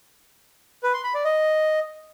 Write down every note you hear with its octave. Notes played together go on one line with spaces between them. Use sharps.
B4
C6
B5
D5
D#5